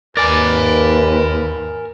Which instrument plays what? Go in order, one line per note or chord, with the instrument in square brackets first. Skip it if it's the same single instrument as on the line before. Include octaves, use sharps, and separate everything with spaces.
[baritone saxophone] D#2 [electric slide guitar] A#4 G#5 [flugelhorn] B4 [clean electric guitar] D5